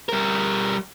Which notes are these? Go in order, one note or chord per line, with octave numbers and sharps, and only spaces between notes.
G3 A#4